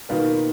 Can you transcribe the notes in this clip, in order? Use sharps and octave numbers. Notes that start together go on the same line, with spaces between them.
B2 D#3 A#3 F4 B4